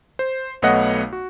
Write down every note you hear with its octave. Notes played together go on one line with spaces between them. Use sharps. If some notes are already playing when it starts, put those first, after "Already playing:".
C5
B1 A3 B3 C#5 D#5 F#5
F#4